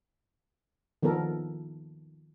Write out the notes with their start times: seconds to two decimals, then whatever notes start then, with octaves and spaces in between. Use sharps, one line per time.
1.03 D#3 F3 B3 A4 A#4